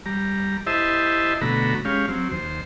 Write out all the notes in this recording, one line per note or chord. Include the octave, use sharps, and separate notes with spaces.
G3 A#5
E4 G4 C5 D#5 E5 A5
B2 D3 A3 F#4 A#5 B5
G#3 C#4 G4 F5
F#3 C4
D#2 C5